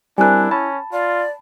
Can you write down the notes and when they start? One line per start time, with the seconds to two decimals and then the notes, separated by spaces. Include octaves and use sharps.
0.18 G3 C4 D4 E4 A#4 G#5 F#6
0.51 C#4 A5 B5
0.92 F4 D5